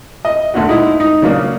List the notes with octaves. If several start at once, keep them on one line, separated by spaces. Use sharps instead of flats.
D#5
D2 A#2 F#4
G#3 D#4 E4
D#4
C#3 F#3 A#3 D4